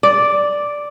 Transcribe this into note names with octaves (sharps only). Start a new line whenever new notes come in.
D5